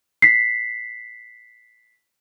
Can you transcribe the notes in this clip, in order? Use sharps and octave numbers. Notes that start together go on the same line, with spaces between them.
B6 C7